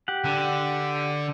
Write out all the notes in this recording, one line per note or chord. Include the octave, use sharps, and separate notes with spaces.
G4 F#5
D3